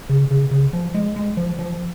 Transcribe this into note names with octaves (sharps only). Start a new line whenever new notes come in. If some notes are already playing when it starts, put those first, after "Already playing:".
C#3
C#3
C#3
F3
G#3
G#3
F3
F3